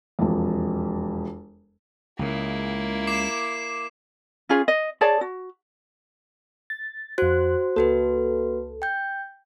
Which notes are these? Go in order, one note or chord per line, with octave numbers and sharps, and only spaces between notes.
E1 F2
C#2 C#3 A#3 E4
D6 C7 E7
C#4 F4 G#4
D#5
G#4 C#5 D5 A5
F#4
A6
F2 F#4 C5 F#6
C#2 A#3 F#4 A4 B4
G5 G6